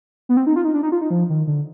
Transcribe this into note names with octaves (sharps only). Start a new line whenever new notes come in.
B3
C4
D#4
F4
D#4
D4
D#4
F4
D#4
F3
D#3
D3